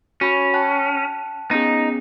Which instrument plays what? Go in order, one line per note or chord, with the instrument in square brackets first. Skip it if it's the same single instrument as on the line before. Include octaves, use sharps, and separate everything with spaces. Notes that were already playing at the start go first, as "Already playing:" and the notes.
[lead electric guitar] C#4 [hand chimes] F#4 B5
[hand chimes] G5 A5 F#6
[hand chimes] B3 C#4 G#4 [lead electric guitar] D#4